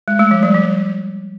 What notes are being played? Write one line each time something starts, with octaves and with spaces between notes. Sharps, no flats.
G#3
A3
F3
G3
F3